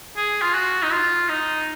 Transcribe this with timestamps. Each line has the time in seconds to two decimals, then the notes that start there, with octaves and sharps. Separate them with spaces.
0.17 G#4
0.42 F4
0.55 F#4
0.83 D#4
0.92 F4
1.29 D#4